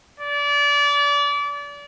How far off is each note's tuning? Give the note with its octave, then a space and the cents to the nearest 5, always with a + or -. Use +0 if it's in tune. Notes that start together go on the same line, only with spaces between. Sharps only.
D5 -30